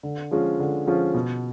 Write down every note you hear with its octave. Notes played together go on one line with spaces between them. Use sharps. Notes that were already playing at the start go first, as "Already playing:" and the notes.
D3
F3 G#3 C#4 F4
D3
F3 G#3 C#4 F4
B2